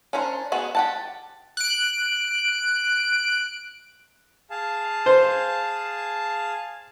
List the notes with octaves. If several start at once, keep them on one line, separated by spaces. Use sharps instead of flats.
C#4 D4 A#4 C5
B3 F#4 G#4
G4 F#5 A5
F#6 D7
G#4 F5 A5
C5